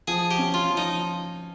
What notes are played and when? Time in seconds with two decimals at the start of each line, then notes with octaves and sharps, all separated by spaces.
0.08 F3 G#4
0.31 G4
0.39 C#4
0.54 F4
0.70 F3
0.77 D#4